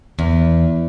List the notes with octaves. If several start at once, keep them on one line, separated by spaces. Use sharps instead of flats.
E2